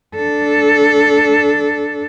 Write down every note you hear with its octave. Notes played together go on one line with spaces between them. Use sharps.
D4 A4